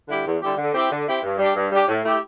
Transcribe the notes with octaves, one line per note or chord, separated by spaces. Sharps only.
D3 G3 E4 G4
E2
D3 G3 E4 G4
D3
C4 E4 G4
D3
C4 E4 G4
G2
G3 D4 G4
G2
G3 D4 G4
A2
A3 E4 G4